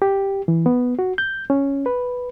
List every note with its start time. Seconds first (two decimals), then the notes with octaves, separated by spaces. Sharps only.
0.02 G4
0.48 E3
0.66 B3
0.99 F#4
1.18 G6
1.50 C#4
1.86 B4